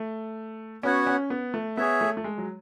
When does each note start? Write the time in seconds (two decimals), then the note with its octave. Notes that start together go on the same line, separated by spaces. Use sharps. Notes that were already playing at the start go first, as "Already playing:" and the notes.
Already playing: A3
0.83 B3 C#4 F#4 C#5 F#5
1.07 C#4
1.30 B3
1.54 A3
1.77 B3 G#4 C#5 E5
2.01 A3
2.17 A3
2.24 G#3
2.38 F#3